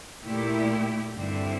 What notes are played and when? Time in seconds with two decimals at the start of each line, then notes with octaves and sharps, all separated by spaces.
0.25 A#2 A3 E4 G4
1.14 G2 D3 G3 C4 E4